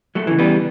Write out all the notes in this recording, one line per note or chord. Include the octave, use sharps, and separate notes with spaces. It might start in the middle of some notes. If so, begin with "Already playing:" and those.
F#3 A3
C#3 E3
G3 B3